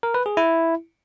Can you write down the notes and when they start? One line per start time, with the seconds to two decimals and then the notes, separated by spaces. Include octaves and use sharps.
0.03 A#4
0.14 B4
0.26 G#4
0.37 E4